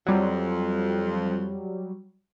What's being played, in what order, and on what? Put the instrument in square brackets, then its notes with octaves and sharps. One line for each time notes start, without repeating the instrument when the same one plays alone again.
[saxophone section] F2 [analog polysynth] F#3 G3